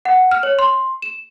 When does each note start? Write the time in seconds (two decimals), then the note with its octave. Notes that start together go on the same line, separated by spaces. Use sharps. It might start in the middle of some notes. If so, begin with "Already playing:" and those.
0.05 F#5
0.31 F6
0.43 C#5
0.59 C6
1.02 E7